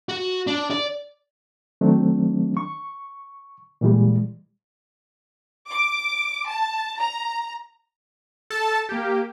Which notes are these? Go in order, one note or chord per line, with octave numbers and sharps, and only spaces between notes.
F#4
D4
D5
D#3 F#3 A3 C4 D4
C#6
A#2 E3 G3 G#3
D6
A5
A#5
A4 A5
A#3 G4